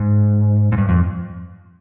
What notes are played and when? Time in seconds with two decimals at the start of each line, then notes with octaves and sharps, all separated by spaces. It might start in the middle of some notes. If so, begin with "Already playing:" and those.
Already playing: G#2
0.72 G#2
0.78 G2
0.89 F2